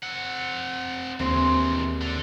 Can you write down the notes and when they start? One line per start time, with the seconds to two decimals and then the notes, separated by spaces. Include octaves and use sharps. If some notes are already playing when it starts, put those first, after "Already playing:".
0.03 C4 F#5
1.20 D#2 E3 G#3 C4
2.01 D3